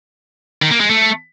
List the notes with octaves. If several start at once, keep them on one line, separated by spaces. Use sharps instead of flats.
D#3
A#3
G#3
A3